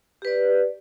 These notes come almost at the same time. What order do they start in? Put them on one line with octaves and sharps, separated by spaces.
G4 B4 D5